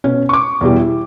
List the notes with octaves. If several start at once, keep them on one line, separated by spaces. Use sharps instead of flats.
B2 C#4
C#6 D6
E2 B2 E3 G3
E4